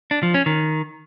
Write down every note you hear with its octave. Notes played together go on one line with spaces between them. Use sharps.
D4
F3
C#4
D#3